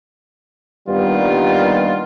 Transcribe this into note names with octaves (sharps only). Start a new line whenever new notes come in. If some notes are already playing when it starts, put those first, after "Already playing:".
G2 A#2 D#3 G3 B3 F4